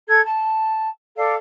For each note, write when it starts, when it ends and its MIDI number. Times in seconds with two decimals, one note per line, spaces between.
0.08 0.19 69
0.08 0.19 92
0.24 0.89 81
1.16 1.34 69
1.16 1.34 74
1.16 1.34 77